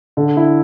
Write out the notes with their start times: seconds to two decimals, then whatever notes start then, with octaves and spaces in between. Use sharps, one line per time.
0.17 D3
0.37 E4